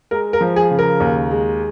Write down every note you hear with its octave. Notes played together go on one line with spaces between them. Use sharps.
G#3 A#4
A#4
F3
G#4
C#3
A#4
D#2
G#3